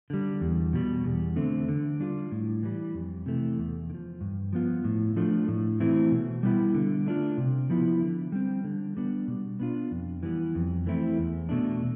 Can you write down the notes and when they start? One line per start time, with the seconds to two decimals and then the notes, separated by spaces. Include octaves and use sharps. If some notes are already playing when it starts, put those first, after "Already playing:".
0.10 D3 G3
0.41 E2
0.73 B2 G3
1.04 E2
1.36 D3 A3 C4
1.68 D3
2.00 G3 D4 F4
2.32 A2
2.63 E3 G3
2.94 F2
3.26 C3 E3 A3
3.58 E2
3.90 D3
3.94 F3
4.21 G2
4.53 F3 B3 F4
4.84 A2
5.16 F3 A3 D4 F4
5.48 A2
5.80 E3 A3 C4 E4
6.11 B2
6.43 G3 B3 E4
6.74 D3
7.06 A3 D4 F4
7.38 C3
7.70 F3 B3 E4
8.02 D3
8.32 G3 C4
8.64 D3
8.97 G3 B3 D4
9.28 B2
9.60 B3 D4 F4
9.91 F2
10.23 E3 G3 B3
10.55 F2
10.86 E3 A3 C4 E4
11.18 E2
11.49 B2 A3 D4